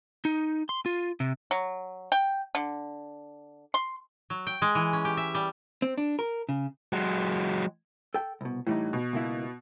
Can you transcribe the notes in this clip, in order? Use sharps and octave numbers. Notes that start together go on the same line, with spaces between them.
D#4
C6
F4
C3
F#3
G5
D3
C6
F#3
G5
G#3
E3
C#4
G4
E5
G3
C4
D4
A#4
C#3
F#3 G#3
A4 G5
C2 B2
A2 E3 G3 D#4
B2
C#2 A#3 E4